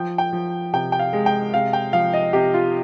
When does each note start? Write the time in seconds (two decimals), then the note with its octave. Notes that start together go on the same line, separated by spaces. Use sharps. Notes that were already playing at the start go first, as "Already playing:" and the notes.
Already playing: F3 G5
0.18 G5
0.33 F3
0.73 C3 G5
0.92 G5
0.99 F5
1.13 G#3
1.26 G5
1.54 C3 F5
1.73 G5
1.93 F3 F5
2.13 D#5
2.33 C3 G4
2.54 F4